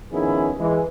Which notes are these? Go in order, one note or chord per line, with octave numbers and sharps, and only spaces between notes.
D#3 F3 B3 C#4 E4 G#4
E3 G#3